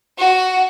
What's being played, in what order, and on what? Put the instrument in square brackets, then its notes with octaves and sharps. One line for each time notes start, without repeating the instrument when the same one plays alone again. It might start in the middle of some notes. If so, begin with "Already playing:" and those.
[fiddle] F#4